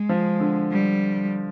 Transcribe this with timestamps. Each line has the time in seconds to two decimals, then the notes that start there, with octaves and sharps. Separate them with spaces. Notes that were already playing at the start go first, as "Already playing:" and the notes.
Already playing: G#3
0.09 F3
0.40 D3
0.72 G3